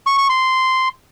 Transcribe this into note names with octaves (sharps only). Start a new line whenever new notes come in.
C#6
C#6
C6